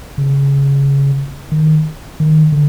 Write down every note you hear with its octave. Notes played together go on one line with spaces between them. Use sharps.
C#3
D#3
D#3
D3